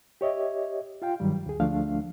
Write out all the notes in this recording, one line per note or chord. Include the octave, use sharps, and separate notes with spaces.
G4 C#5 D#5 E5
F4 F5 G5
G2 D#3 F#3 G3
D2 G#4
D2 F3 A3 D4 F5